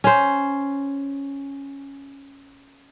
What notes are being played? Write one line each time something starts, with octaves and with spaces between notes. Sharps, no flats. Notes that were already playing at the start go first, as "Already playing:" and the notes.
C#4 C5